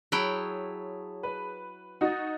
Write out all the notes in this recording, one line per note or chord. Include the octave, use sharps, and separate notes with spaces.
F#3 E4 G#4 C#5 G5 A5
B4
D#4 F#4 D#5 F#5 A6